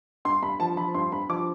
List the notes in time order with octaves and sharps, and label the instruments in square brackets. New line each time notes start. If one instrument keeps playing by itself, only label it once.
[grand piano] G2 C6
G2 B5
F3 A5
F3 B5
G2 C6
G2 B5
F3 D6